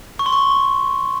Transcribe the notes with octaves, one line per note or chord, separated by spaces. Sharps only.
C#6
C6
C#6